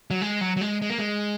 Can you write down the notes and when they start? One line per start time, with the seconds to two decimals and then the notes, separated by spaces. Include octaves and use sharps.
0.11 F#3
0.21 G#3
0.41 F#3
0.57 F#3
0.61 G#3
0.82 G#3
0.90 A#3
0.99 G#3